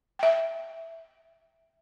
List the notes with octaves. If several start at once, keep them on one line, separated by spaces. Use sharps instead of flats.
E5 G5